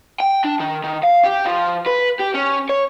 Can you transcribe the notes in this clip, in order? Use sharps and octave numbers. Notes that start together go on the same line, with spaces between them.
G5
D4
D#3
D#3
F5
G4
F3
B4
G4
C#4
C#5